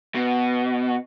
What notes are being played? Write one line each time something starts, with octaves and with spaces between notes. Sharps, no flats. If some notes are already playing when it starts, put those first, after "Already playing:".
B2